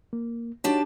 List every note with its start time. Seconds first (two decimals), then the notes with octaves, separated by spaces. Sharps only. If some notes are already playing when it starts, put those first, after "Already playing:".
0.13 A#3
0.64 D4 D#4 F#4 G4 C#5 A5